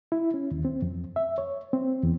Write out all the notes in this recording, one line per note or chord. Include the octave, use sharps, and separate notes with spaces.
E4
C#4
D#2
C4
F2
E5
C#5
C4
E2